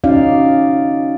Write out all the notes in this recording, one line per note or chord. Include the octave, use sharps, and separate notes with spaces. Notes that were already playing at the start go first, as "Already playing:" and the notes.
C#4 D#4 F#4 D5 F5